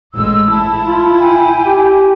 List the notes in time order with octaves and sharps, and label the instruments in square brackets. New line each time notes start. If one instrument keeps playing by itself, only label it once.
[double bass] A1 G#3 [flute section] E6
[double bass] E4 [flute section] A5
[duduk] F4
[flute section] G5 G#5
[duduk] G4